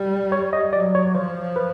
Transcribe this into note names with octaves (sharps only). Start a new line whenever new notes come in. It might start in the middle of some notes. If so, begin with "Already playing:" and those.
Already playing: G3
C#5
D#5
F#3 D5
C#5
F3 C5
B4